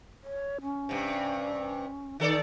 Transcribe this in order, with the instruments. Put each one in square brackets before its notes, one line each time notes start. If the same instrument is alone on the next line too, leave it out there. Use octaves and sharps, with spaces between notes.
[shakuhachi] C#5
C#4
[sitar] G2 C3
[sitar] D#3 A4 D5 [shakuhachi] D#4